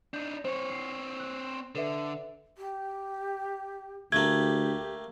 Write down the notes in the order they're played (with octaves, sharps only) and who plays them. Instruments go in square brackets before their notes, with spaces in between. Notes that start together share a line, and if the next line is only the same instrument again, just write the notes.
[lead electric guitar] D4 D#4 [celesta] G6
[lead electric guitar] C4 C#5 [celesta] C5
[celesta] C7
F#6
[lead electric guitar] D3 [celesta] A4 B4 E5
[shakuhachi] G4
[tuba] D2 [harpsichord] A3 A#3 [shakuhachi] G4 [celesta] G#6